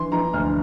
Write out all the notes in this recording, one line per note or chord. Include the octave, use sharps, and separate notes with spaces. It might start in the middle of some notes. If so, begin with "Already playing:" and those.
Already playing: E3 C6
E3 A#5
D2 F6